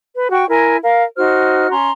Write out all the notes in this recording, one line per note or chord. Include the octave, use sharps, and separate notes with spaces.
B4
F#4 G5 C#6
E4 A#4 G#5
A#4 F5
D#4 F#4 C5 F6
C#4 A#5 C6